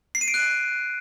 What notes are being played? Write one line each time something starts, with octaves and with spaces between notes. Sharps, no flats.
C7
D#7
D7
F#6